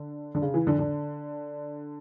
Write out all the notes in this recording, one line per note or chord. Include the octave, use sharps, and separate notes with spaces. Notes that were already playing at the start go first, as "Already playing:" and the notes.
Already playing: D3
D3
C#3
E3
D3
D3